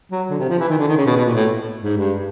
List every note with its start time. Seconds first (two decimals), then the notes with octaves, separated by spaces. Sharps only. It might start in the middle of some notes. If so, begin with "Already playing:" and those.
0.11 F#3
0.30 D3
0.39 C3
0.49 F3
0.59 E3
0.69 D#3
0.78 D3
0.87 D#3
0.97 C#3
1.06 B2
1.16 B2
1.25 A#2
1.34 A2
1.82 G#2
1.97 G2